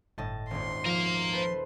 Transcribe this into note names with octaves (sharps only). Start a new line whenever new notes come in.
G1 A2 D#5 A5
D#1 G#1 C6
F3 A#4 F5
A4 B4 C5